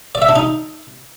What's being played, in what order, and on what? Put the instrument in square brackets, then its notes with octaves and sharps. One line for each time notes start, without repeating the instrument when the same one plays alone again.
[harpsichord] D5
E5
D4
D#4